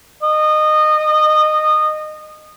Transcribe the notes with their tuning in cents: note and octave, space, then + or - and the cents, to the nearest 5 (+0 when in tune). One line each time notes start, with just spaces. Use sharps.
D#5 -20